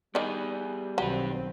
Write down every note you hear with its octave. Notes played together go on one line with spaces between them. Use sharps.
D#3 G3 B3 G#4 B4 D5
B1 D#3 F#3 C4 G4 B4